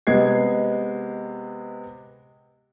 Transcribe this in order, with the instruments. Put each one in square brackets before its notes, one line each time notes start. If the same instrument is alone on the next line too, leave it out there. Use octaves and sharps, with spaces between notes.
[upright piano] C3 G#3 B3 G#6 C7